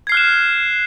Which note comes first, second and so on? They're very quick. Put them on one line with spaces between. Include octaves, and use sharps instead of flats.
G#6 C7 F6 F#6 E7